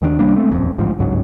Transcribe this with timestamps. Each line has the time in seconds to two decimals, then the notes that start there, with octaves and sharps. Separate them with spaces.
0.02 D#2 D#3 A3 D4
0.19 C2 G3 A#3 D4
0.36 G#3 A3 C4
0.51 D#1 A1 F2
0.78 A1 D2 G#2 F3
0.99 G1 C#2 G#2 F#3